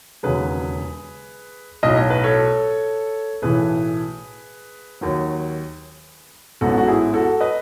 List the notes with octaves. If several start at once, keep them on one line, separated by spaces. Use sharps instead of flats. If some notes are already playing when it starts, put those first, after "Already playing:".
E1 D#2 C#3 F#3 G#4 B4
B1 A2 F#3 D#5
C#5
B4
A4 C#5
B1 A2 E3 A3 G#4 B4
D#2 D#3 F#3
A1 G#2 F#3 B3 F#4 A4
F#4
E4 G#4
F#4 A4
B4 D#5